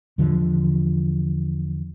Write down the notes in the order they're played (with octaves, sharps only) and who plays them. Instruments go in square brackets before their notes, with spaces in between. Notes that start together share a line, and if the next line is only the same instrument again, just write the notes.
[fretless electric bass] E2 D3 F3